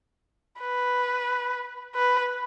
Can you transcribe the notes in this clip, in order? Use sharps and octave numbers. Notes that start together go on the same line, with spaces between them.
B4
B4